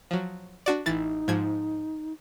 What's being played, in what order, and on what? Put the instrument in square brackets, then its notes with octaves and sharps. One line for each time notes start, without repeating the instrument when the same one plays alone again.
[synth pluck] F3 F#3
D4 F#4 D5
[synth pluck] A1 E3 A6 [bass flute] D#4
[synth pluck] G#2 F3 G#6